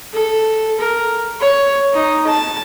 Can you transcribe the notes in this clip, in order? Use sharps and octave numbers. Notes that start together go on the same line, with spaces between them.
A4
A#4
C#5
D#4
A5